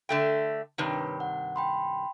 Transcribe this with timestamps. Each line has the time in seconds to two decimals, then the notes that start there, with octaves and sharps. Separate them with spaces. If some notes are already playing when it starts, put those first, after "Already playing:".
0.09 D3 A3 G5
0.78 G2 C3 D#3 B4 C#5 B5
1.20 F#5
1.56 G5 B5 C6